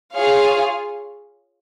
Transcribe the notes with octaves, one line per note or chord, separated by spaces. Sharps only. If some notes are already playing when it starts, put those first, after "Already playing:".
F4 G#4 C#5 F5